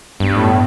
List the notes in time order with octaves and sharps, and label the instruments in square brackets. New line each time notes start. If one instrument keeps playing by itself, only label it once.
[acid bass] G2 [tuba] B3
[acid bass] A2